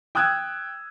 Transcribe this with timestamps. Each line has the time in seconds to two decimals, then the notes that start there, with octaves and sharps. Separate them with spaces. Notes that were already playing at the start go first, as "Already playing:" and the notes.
0.15 G5 D#6 E6 F#6 G#6